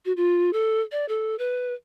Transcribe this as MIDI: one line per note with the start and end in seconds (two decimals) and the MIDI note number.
0.05 0.12 66
0.17 0.53 65
0.53 0.81 69
0.92 1.05 74
1.08 1.36 69
1.39 1.74 71